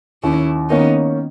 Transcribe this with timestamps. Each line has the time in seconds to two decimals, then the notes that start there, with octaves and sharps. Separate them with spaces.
0.23 D#2 C#4 E4
0.70 D#3 A#3 B3 C#4 D#4